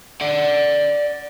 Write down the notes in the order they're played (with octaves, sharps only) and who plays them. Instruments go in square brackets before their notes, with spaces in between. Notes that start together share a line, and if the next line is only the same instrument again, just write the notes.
[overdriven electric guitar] D5 F#5